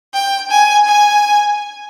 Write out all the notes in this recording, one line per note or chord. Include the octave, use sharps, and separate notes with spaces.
G5
G#5
G#5